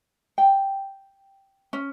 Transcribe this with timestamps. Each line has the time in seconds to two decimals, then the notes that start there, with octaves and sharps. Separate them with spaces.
0.38 G5
1.73 C#4